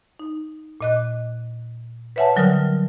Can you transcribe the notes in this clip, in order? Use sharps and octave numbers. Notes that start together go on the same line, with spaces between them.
D#4
A#2 D#5 F#6
B4 C#5 E5 F#5 G#5 A5
D3 F#3 G3 A#4 D#6 F6